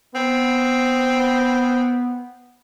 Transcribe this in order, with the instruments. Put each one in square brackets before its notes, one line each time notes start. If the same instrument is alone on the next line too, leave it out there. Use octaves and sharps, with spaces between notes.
[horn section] B3 [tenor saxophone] C4